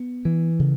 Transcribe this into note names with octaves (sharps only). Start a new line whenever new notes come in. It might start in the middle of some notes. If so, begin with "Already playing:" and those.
Already playing: B3
E3
C#3